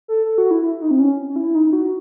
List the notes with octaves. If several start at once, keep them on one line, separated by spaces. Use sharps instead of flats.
A4
A4
F#4
E4
E4
D#4
C4
C#4
E4
D#4
F#4